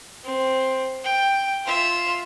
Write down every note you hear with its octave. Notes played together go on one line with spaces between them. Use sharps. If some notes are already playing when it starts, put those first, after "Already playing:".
C4
G5
F4 E5